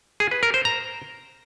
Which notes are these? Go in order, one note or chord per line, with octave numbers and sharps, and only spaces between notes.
G#4
B4
A#4
C5
A#5